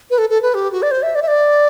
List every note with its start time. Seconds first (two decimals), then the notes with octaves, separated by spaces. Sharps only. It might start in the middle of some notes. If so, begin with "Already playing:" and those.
0.11 B4
0.18 A4
0.30 A4
0.42 B4
0.54 G4
0.72 F#4
0.82 D5
0.91 C5
1.03 E5
1.15 D5
1.22 E5
1.28 D5